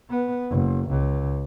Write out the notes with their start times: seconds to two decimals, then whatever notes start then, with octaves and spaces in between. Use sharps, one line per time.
0.10 B3
0.50 F#1
0.90 C#2